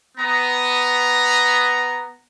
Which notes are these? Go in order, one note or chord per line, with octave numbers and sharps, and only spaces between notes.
B3 A#5